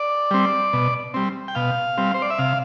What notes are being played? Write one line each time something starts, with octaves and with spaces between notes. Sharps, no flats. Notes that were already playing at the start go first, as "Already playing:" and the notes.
Already playing: D5
G3 C4
B2
G3 C4
G5
B2 F5
G3 C4
C5
D5
E5
C3 F5